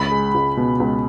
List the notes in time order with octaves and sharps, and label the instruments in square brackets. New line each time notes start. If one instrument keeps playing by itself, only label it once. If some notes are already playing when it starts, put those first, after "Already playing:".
Already playing: [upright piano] C#2 [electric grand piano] B5
[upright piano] G#3
C#2
B2
C#2